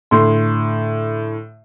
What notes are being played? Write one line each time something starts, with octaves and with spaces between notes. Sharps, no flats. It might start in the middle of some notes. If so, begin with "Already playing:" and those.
A2 D3 C6